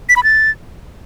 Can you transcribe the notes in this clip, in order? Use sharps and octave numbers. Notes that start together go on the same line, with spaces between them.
B6
B5
A6